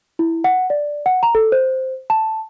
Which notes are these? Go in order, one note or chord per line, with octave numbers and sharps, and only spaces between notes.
E4
F#5
D5
F#5
A#5
A4
C5
A5